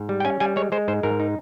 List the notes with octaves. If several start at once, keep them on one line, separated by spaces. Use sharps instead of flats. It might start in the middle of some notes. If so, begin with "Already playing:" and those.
Already playing: G#2
G3
G5
C#4 G#5
G3 G#5
G#3 C#5
G#3 C5
G#2 C5
G#2 A#4
D#4